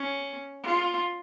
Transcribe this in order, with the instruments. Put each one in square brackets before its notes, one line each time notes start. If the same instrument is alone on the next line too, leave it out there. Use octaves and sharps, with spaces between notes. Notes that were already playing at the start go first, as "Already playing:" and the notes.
Already playing: [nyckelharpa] C#4
F4